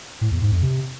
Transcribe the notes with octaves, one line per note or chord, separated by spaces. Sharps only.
A2
E2
G#2
F2
C3